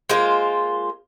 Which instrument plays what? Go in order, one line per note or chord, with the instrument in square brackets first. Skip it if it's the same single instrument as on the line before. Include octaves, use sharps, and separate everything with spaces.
[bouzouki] G#3 A#3 F4 C5